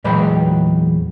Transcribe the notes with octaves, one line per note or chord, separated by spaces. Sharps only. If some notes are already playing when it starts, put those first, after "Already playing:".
E2 A#2 F#3 G#3 B4 G5